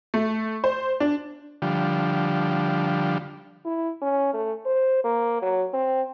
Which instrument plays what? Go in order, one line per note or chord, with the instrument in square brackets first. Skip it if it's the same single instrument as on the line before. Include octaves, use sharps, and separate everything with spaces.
[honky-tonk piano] A3
C5
D4
[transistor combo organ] D3 F3 G3
[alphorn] E4
C#4
A3
C5
A#3
F#3
C4